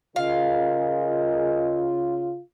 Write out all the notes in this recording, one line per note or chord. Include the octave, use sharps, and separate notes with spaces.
C#3 F4 G#4 A#4 D#5 F5